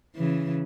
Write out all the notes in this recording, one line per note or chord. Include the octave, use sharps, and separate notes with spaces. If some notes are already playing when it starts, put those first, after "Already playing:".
C#3 E3